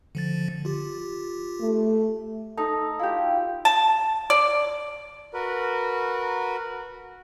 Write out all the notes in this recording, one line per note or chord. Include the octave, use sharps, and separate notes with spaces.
D3 F3 A6
F4 G4
A3
D#4 A4
E4 F4 G4
A5
D5
F#4 A#4 B4